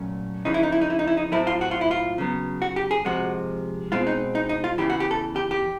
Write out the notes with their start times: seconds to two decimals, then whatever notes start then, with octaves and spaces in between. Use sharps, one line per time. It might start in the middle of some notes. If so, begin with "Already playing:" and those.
Already playing: A#2 F#3 A3 C#4
0.45 F2 C#3 E3 D#4
0.54 E4
0.63 D#4
0.72 E4
0.81 D#4
0.90 E4
0.99 D#4
1.07 E4
1.17 D#4
1.32 A2 F#3 A3 C4 E4
1.47 F4
1.61 F#4
1.71 F4
1.81 E4
1.91 F4
2.18 C#3 F#3 B3
2.62 F#4
2.76 G4
2.91 G#4
3.05 C3 F3 G#3 F#4
3.92 B2 G#3 C4 F4
4.07 D#4
4.35 D#4
4.49 D#4
4.64 F4
4.78 E2 C#3 E3 G4
4.90 F#4
5.00 G4
5.11 A4
5.36 G4
5.51 G4